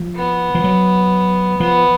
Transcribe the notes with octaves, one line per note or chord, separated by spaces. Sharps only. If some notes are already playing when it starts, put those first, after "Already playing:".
Already playing: F3
B3
F3
F#3
F3 B3